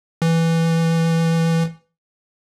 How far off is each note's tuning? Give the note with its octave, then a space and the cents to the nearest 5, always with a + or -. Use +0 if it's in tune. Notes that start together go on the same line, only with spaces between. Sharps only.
E3 +0